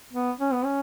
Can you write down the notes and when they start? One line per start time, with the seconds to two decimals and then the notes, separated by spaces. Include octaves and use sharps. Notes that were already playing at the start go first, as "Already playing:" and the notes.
0.13 B3
0.40 C#4
0.53 B3
0.65 C#4